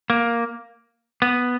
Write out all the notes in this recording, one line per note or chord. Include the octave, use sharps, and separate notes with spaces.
A#3
B3